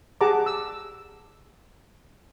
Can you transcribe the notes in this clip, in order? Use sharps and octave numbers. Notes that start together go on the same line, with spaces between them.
G4 G#4 F#5 A5 A#5 D6
E6